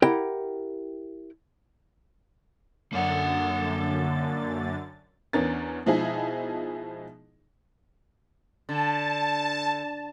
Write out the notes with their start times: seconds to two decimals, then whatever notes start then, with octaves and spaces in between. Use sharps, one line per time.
0.02 E4 G4 A#4 F#5 G5
2.93 F#2 D3 A#3 F#5 A6
5.33 E2 B3 C#4 D4 A#4 A6
5.86 B2 F3 G#3 D#4 E4 G#4
8.69 D3 A5